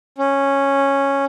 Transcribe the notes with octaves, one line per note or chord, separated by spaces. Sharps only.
C#4